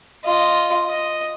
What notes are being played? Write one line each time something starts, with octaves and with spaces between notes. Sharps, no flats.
F4 D#5
D#5